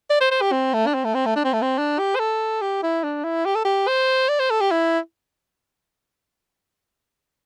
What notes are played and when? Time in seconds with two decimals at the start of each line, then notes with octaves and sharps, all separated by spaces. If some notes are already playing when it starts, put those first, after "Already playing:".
0.10 D5
0.21 C5
0.31 C5
0.42 G4
0.52 C4
0.74 A3
0.87 D4
0.94 C4
1.05 A3
1.15 C4
1.26 A3
1.36 D4
1.45 C4
1.53 A3
1.62 C4
1.78 D4
1.99 G4
2.16 C5
2.20 A4
2.61 G4
2.83 E4
3.04 D4
3.24 E4
3.45 G4
3.55 A4
3.65 G4
3.87 C5
4.29 D5
4.40 C5
4.51 A4
4.61 G4
4.71 E4